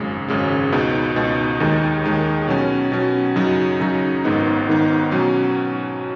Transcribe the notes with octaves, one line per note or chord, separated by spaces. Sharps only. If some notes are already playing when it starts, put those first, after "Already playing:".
Already playing: G#1 F#2 C#3 G#3
G#1 F#2 C#3 G#3
C#2 B2 B3 D#4
C#2 B2 B3 D#4
D#2 D#3 G#3 D#4
D#2 D#3 G#3 D#4
B2 F#3 C#4
B2 F#3 C#4
F#2 C#3 F#3 D#4
F#2 C#3 F#3 D#4
G#1 G#2 D#3 B3 D#4
G#1 G#2 D#3 B3 D#4
B2 F#3 C#4